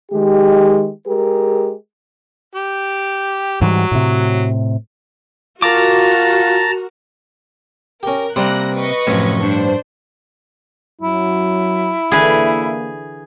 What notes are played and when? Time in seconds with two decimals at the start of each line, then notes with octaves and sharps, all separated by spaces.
0.12 D#3 G#3 G4
1.08 G#3 G4 G#4 A#4
2.55 G4
3.61 G#2 E3 F#3 G3
3.91 A2 C3
5.62 F4 F#4 A#4 A5 A#5 D6
8.03 C#4 G4 A#4
8.36 C3 G3 A#3 C5 D5 F#6 A#6
8.75 B4 D#5 C#6
9.07 F#2 A2 C3 F3 C#4
9.43 G2 D4 C5
11.02 F#2 F#3 E4
12.12 D3 E3 A#3 G#4 B4